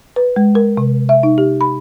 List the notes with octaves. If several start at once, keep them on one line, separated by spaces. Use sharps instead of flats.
B4
G#3
A#4
C3
E5
D#4
G4
B5